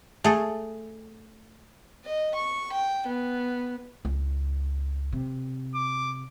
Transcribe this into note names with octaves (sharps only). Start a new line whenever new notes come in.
A3 G#4 A4
D#5
C#6
G5
B3
C#2
C3
D6